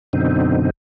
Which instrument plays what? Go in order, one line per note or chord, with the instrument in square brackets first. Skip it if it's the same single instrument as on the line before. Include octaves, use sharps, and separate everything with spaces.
[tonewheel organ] F#2 B2 D3 C4 D#4